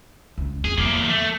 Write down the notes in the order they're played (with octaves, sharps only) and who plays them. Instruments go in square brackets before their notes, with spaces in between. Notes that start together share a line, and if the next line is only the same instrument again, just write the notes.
[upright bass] C#2
[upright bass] F2 G#3 [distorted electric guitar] G#4
[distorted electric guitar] E2 A#3 [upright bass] G3
[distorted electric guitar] A3